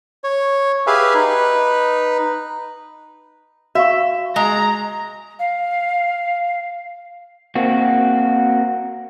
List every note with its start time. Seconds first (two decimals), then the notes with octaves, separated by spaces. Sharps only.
0.24 C#5
0.87 G4 G#4 B4 E5 F5 G#5
1.14 D#4 B4
3.75 F#4 E5 F5 C#6
4.36 G#3 A#5
5.39 F5
7.55 A#3 C4 F#4